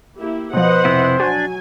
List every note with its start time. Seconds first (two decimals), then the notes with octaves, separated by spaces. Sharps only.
0.17 A#3 E4 G4
0.53 B2 F3 B4 C5 D#5 F#5
0.85 F2 C3 E4
1.20 F#3 D4 F#4 G#5